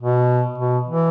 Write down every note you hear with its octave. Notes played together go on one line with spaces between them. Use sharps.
B2
B2
E3